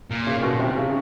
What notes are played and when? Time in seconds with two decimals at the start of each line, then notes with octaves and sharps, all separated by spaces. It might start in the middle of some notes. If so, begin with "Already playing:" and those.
0.10 A#2
0.27 C#3
0.43 B2
0.60 C3
0.76 C#3